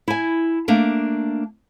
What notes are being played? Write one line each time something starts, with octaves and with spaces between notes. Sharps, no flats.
E4 G#5
A3 A#3 D4